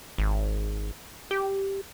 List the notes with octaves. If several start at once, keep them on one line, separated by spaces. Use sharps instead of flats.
G#1
G4